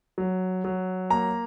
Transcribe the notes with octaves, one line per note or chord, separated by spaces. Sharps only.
F#3
F#3
A#3 A#5